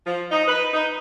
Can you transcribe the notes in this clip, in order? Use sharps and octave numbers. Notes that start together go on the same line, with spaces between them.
F3
D#4
B4
D#4